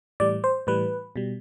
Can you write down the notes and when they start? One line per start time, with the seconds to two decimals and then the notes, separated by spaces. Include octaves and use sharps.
0.20 A2 E3 G3 D5
0.44 C5
0.67 A2 E3 G3 B4
1.16 B2 G3